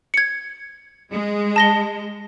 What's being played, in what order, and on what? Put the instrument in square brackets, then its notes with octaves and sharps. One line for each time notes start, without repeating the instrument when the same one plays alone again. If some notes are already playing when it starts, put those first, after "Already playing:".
[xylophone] G#6 C#7
[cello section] G#3
[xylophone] A5 A#6 G7